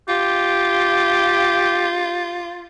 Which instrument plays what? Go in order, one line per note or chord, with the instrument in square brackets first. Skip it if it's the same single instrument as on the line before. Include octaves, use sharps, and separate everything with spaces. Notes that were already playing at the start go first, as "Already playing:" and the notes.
[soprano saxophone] F4 [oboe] G4